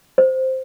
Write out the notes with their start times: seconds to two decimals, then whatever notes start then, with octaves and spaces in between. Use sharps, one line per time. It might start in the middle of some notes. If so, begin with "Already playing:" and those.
0.18 C5